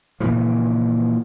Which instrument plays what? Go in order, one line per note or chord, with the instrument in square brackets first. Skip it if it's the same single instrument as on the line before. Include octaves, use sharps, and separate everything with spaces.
[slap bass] A#2 C#3 E3 F3